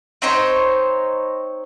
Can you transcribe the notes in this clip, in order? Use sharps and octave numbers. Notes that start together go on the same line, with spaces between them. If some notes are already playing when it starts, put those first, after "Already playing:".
C4 D#4 C5 C#5